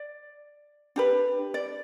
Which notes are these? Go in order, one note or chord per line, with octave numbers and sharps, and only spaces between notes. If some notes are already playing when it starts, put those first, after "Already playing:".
Already playing: D5
D4 G4 B4
D5